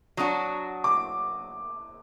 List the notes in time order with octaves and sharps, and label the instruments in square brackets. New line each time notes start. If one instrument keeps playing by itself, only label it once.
[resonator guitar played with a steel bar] F#3 D4 F#4 [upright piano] D#6
[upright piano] D6